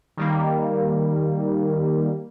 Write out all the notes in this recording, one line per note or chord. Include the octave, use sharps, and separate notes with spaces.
D#3 G3 A#3